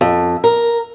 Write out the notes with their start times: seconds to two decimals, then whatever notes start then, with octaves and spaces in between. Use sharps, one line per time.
0.01 F2
0.44 A#4